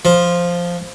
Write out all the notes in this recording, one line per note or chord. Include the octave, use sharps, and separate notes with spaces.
F3